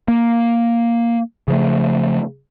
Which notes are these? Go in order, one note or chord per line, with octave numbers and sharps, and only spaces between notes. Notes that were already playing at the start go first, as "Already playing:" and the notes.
A#3
C#3 F3 A3